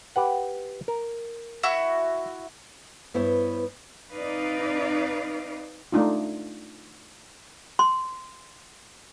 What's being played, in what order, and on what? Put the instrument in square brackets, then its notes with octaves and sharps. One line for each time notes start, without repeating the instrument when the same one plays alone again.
[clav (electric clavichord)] G4 B4 F#5
A#4
[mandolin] E4 F#4 E5
[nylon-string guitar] G2 B3 E4 C5 C#5
[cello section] C4 D#4 B4 D5 F5
[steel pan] A3 D4 D#4 F4
[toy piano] C6